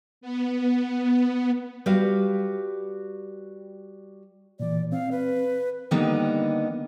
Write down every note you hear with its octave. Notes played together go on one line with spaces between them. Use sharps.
B3
G3 F#4 G4 B4 F5
A#2 E3 D5
C4 F5
B4
D3 D#3 G3 A#3 B3 D#4